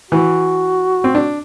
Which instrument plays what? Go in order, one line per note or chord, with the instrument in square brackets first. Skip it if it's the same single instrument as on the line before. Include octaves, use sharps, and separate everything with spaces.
[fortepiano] E3 [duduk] F#4
[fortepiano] C4
D4